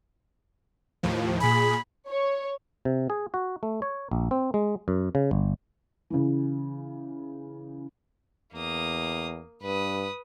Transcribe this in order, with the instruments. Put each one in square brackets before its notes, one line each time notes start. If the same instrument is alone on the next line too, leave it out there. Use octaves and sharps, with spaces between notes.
[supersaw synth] D#2 A2 F3
[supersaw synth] A#2 G#4 [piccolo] B5
[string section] C#5
[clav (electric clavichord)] C3
G#4
F#4
A3
C#5
A#1
C4
G#3
F#2
C#3
G1
[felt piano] C#3 E3
[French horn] E2 [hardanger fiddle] A#3 D#6
[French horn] G2 [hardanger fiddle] B4 D#6